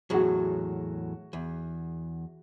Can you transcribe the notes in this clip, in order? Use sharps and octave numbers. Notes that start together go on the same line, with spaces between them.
E2 A2 F#3 F#4 G#4
E2